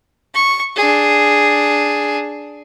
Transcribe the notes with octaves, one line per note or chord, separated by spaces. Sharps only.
C#6
D4 G#4